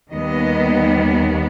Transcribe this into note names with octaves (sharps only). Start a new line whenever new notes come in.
D#2 D#3 G3 B3 D#5